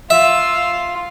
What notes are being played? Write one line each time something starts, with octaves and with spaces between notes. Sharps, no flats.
F4 E5